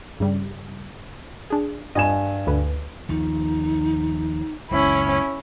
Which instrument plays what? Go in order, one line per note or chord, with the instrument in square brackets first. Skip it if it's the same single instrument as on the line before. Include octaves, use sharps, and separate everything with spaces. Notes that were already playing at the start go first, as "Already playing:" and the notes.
[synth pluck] G2 C#3 G3
D4 G#4
[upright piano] G2 G#5 E7 [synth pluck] D#5
[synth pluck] D2 D3 B4
[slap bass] D#2 F3 [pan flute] D#4
[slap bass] F#1 C#2 C#3 [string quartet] C#4 E4